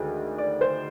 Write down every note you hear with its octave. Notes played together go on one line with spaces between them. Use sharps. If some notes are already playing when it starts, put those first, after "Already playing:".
Already playing: D2 D#3 G#3
D5
C5